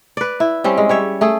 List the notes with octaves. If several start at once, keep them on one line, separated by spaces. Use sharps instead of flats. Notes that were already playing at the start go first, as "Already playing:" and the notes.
B4 D5
E4
G3 C4 C#4
G#3
G3 C#5 E5
A3 G#4 A4